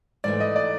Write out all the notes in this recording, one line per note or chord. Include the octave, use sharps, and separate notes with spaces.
G#2 E3 A3 D5
D#5
D5